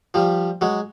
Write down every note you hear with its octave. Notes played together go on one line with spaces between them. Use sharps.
F3 G3
F#3 G#3